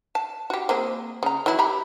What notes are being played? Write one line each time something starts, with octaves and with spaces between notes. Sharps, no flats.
A5
F#4 G4
A#3 C4 G#4
C#3 A#5
E3 F#3 E4
G4 A#5 B5